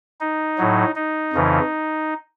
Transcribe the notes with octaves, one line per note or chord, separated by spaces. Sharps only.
D#4
A2 F#3
D#4
F2 C#3 E3